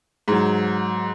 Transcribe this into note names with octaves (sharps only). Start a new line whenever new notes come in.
G#2 F#3